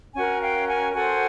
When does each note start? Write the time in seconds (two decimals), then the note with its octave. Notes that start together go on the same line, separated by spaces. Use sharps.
0.15 C#4 F#4 A#4 F#5 G#5
0.41 F5 G5
0.68 F#5 G#5
0.93 F#4 A4 C5 F#5 G#5